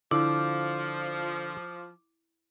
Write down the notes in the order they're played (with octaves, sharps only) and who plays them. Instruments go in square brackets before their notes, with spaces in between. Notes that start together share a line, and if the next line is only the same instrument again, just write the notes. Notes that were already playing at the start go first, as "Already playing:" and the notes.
[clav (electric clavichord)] D3 [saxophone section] F3 [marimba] E4 [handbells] D6